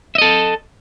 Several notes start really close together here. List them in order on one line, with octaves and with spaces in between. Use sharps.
E5 D#5 A4